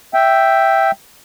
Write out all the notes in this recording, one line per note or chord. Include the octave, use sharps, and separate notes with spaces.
E5 G5